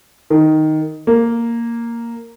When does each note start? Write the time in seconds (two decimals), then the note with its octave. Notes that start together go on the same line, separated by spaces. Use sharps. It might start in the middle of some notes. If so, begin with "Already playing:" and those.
0.30 D#3
1.07 A#3